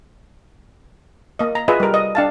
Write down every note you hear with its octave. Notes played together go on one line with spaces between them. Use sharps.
A#3 D#5
A#5
F4 G#4 B4 D#5 E5
G3 A#4
D#5
D4 F5 A5